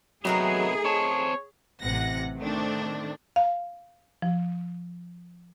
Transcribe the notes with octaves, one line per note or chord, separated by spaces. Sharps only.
C3 F#3 A3 B3 D#4 G#4 A#4
C4 C#5 A5
A1 C3 F#5 A#6
D#3 A3 C4 D4
F5
F3